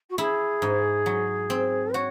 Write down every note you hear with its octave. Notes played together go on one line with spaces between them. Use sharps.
F#4
E4 G#4
G#2
F#3
C4
F#4 C#5